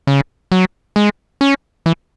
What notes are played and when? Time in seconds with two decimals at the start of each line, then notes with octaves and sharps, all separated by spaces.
0.07 C#3
0.52 F#3
0.96 G#3
1.41 C#4
1.86 E3